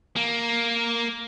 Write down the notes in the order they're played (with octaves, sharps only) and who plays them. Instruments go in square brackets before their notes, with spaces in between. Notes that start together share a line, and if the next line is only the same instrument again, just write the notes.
[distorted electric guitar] A#3